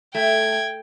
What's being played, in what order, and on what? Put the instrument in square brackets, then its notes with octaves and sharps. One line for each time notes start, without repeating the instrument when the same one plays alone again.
[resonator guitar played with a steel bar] A3 [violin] G5 G#6